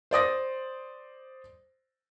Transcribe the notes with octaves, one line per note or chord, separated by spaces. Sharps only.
C5 D5 D#6 A#6